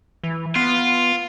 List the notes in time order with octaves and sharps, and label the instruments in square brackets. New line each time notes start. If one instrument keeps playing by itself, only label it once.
[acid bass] E3
[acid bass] B3 [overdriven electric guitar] F4